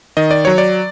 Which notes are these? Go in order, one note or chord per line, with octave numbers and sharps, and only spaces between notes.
D#3 D#5
D5
F#3 C#5
D5